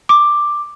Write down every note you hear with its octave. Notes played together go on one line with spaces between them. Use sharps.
D6